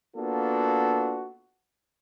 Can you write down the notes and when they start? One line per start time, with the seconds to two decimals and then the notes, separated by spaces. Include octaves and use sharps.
0.17 A#3 B3 D4 F4 F#4 A4